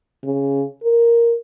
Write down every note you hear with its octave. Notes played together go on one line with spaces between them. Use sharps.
C#3
A#4